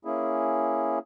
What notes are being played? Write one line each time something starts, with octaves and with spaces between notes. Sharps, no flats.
A#3 C#4 E4 G#4